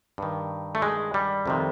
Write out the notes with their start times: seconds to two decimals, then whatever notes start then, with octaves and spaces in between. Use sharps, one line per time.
0.18 G2 D#3
0.75 A3
0.82 G#3
1.14 G3
1.46 F2 C3 D#3